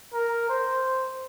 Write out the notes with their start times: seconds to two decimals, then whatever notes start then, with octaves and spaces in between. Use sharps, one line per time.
0.13 A#4
0.49 C5